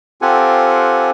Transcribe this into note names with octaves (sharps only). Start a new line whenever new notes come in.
C4 F4 G4 A4 F#5 G#5